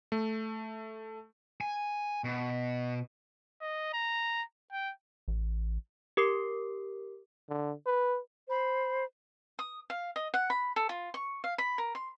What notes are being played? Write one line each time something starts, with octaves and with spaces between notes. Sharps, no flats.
A3
G#5
B2
D#5
A#5
G5
A1
G4 A#4 D6 C7
D3
B4
C5 B5
D#6
F5
D#5
F#5
B5
A4
F4
C#6
F5
B5
A#4
C6